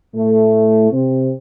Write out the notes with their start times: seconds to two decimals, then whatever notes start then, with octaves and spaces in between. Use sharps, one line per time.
0.14 A2 A3
0.92 C3 C4